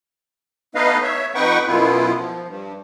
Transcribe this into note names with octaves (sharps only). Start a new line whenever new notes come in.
A3 B3 D#4 B4 D#5 F5
C#5 E5
F2 D#4 B4 F#5 G5 C#6
F#2 B2 B3 E4 F4
F3
G2